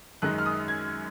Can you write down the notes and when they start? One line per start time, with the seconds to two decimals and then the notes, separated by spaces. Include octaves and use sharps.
0.22 F#2 D#3 G#3 D#4 F#6
0.38 F6
0.46 D#6
0.68 G#6